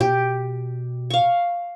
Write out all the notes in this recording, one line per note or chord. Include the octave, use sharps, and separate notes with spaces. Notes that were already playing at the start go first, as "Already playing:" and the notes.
B2 G4
F5 C#6